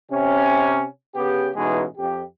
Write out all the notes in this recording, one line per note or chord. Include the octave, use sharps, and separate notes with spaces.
C3 C#4
C#3 B3 G4
A1 B2 E3 G#3 D#4
F2 G4